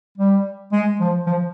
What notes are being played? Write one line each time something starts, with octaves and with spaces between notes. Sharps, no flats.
G3
G#3
F3
F3